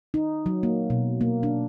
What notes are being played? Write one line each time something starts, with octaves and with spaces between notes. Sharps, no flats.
D#4
F#3
A#3
B2
A#3
D4